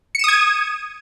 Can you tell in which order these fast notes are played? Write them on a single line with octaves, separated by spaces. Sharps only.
C#7 E7 D#6 G#6 D#7